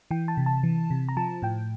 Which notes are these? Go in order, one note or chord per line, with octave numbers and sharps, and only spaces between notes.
E3 G5
A5
C3
A5
E3
C3
A#5
F3 A5
A2 G5